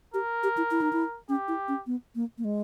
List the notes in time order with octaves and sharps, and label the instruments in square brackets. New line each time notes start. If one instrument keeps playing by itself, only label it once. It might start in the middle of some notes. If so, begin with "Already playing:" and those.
[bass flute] G4 [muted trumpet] A#4
[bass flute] G4
E4
E4
D#4
E4
[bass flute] C#4 [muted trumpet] G4
[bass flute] E4
C#4
B3
A#3
A#3
G#3